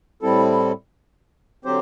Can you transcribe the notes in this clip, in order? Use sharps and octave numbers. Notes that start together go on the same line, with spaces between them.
A2 G3 C4 E4 A4
D3 F#3 C4 G4 C5